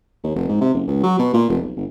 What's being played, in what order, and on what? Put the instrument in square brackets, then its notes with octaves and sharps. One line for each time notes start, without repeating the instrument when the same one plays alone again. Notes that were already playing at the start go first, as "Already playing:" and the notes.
[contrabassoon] D#2
F1
G#2
C3
F#1
C#2
F#3
B2
A#2
F1
B1
G1